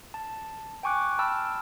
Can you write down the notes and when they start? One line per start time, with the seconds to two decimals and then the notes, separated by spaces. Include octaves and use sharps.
0.14 A5
0.83 G5 G#5 C#6 D6 F#6
1.19 G5 A5 B5 E6 F6